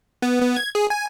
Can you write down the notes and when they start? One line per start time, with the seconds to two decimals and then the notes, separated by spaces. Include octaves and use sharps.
0.22 B3
0.42 B3
0.56 G#6
0.75 G#4
0.90 G#5